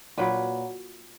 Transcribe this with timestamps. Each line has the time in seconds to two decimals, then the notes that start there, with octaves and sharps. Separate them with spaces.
0.18 A#2 F#3 B4